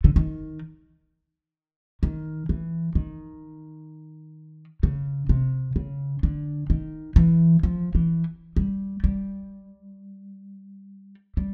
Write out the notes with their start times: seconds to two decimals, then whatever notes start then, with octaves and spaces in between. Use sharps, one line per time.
0.04 D3
0.16 D#3
2.03 D#3
2.49 E3
2.95 D#3
4.83 C#3
5.29 C3
5.76 C#3
6.23 D3
6.70 D#3
7.16 E3
7.63 F3
7.95 E3
8.56 G3
9.04 G3
11.37 G3